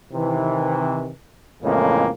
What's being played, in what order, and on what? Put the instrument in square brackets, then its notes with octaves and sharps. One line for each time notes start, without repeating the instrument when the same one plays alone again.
[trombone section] C3 D#3 E3
F2 A2 C#3 E3 G#3 A#3